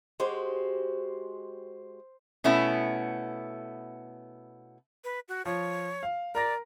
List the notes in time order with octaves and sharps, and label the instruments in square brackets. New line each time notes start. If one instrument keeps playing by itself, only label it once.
[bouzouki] G#3 F#4 G4 [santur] C5
[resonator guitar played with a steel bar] B2 A3 B3 C#4 E4
[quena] B4
F#4
[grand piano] F3 [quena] C#5
[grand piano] F5
[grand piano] A#4 A#5 A#6 [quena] D5